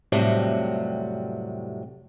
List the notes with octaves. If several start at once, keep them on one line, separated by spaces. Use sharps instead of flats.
F2 A2 C3 F#3 G3